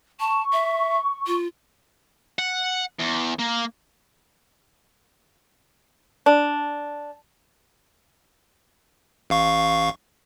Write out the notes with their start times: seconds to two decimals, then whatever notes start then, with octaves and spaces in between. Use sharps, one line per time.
0.20 A5 C#6
0.53 E5
1.27 F4
2.39 F#5
2.99 E2
3.39 A#3
6.26 D4
9.30 A1 F5 C#6